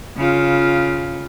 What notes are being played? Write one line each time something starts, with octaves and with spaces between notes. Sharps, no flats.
C#3 F4